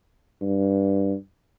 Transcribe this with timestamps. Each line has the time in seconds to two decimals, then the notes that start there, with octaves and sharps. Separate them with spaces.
0.41 G2